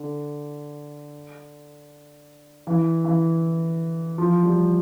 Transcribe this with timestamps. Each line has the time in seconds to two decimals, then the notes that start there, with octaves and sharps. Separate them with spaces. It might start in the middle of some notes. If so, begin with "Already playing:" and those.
Already playing: D3
2.67 E3
3.05 E3
4.18 F3
4.43 G3